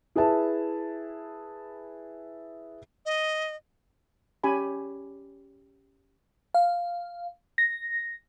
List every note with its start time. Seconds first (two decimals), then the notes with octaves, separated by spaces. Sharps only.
0.16 E4 G#4 B4 E5 A5
3.06 D#5
4.44 C#4 G4 G#5 B5
6.54 F5
7.58 A#6